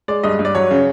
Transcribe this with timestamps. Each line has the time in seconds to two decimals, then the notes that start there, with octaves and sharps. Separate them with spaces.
0.08 G#3 D5
0.23 G2 D#5
0.39 G2
0.45 D5
0.55 F#3 C#5
0.71 C#3